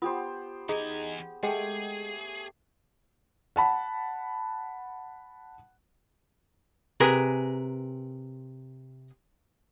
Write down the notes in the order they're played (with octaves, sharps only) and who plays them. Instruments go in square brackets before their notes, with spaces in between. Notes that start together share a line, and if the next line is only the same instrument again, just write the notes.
[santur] B3 G4 C5 [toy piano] F4 D#6
[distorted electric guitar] E2 G#5 [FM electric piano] D#4 [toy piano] G#4
[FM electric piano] G#3 [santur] A3 G4 [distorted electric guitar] G#4 [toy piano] D#5 F#5 G5
[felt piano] F#5 A5 B5
[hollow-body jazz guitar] C3 G#4 A#4 B4 A#5